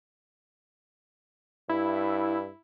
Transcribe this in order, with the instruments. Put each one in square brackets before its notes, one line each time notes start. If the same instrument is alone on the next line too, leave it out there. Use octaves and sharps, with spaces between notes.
[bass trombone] G2 [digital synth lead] E4